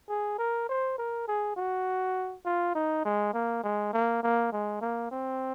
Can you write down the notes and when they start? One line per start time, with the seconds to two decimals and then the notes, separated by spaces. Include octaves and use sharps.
0.09 G#4
0.38 A#4
0.69 C5
0.98 A#4
1.28 G#4
1.57 F#4
2.45 F4
2.75 D#4
3.05 G#3
3.34 A#3
3.64 G#3
3.93 A#3
4.23 A#3
4.52 G#3
4.81 A#3
5.12 C4